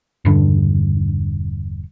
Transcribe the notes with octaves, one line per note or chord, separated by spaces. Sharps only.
E1 G2 D3